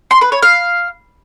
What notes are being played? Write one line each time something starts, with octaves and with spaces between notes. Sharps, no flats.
C6
B4
C#5
F5